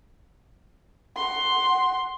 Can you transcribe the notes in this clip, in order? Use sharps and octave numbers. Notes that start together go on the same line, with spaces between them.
F#5 C6